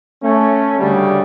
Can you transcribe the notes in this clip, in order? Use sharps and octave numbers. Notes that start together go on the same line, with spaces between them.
A3 C#4
D2 C#3 G3